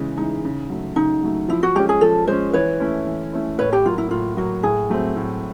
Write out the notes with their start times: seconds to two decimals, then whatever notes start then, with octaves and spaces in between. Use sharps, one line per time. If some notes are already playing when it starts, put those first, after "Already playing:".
Already playing: C#3 E3 G#3
0.17 E3 G#3 D#4
0.45 C#3
0.70 F#3 A3
0.96 C#3 D#4
1.23 F#3 A3
1.49 F3 E4
1.63 F#4
1.75 G#3 C#4 G4
1.89 G#4
2.01 F3 A4
2.27 G#3 C#4 C5
2.53 E3 B4 C#5
2.80 A3 C#4 E4
3.07 E3
3.33 A3 C#4 E4
3.58 A2 B4 C#5
3.73 G4
3.85 F#3 A#3 F4
3.98 E4
4.11 A2 F4
4.37 F#3 A#3 F#4
4.63 A2 G#4
4.90 F#3 A3 C4
5.16 A2